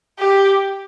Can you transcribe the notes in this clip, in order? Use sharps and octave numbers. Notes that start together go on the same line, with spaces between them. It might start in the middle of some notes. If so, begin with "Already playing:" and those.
G4